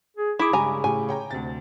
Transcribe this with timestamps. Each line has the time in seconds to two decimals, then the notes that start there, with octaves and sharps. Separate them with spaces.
0.17 G#4
0.39 E4 G#4 B5 D6 D#6
0.53 G2 C#3 G3 G#3 G#5 A#5
0.84 A2 G4 G#5
1.08 C#5 G5 A#5
1.31 D2 C3 A6